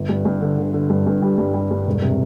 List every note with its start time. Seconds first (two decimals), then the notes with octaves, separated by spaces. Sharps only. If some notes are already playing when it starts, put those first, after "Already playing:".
Already playing: G1
0.09 G2
0.25 G2
0.41 D3
0.58 D3
0.73 D3
0.90 G2
1.07 G2
1.22 G3
1.38 G2
1.54 G3
1.71 G2
1.87 E1
2.02 C3